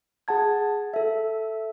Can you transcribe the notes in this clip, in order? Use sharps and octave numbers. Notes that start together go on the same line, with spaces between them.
G#4 F#5 A5 G#6
A4 E5